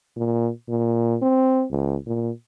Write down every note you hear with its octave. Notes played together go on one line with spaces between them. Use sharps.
A#2
A#2
C4
C#2
A#2